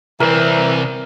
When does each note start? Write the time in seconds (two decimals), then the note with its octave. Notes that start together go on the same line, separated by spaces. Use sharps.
0.20 C2 E3 C4 A#4